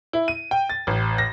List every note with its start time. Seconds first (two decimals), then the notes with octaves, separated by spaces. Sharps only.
0.13 E4
0.28 D#7
0.51 G5
0.70 A6
0.87 A1
1.18 A#6